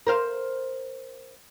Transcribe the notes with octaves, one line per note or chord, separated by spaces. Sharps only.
A#4 C5 F5